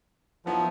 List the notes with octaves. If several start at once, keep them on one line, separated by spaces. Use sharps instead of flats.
F3 F#3 B3 E4